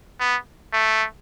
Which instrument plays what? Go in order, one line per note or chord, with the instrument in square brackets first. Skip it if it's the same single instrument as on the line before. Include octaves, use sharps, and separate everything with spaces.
[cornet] B3
A3